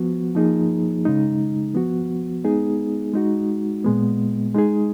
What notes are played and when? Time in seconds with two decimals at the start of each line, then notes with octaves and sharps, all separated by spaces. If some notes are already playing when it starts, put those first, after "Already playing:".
Already playing: F3 B3 F#4
0.35 F3 A#3 D#4 G#4
1.05 C#3 G#3 D#4
1.75 F3 B3 F#4
2.44 G#3 B3 D#4 G#4
3.14 G#3 D#4 F#4
3.84 A#2 G#3 B3
4.54 G#3 D#4 G#4